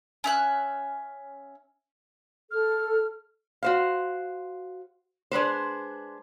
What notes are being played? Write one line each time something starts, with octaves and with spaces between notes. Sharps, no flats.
C#4 E5 F#6
A4 F6
F#4 C5 F5
G#3 D4 B4 C5